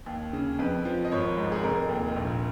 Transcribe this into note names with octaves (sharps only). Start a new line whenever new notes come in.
D#2
C#3
F2 B4
F3
D#5
G#1 C#5
G#2
G#4
F1 A#4
D#2
A#1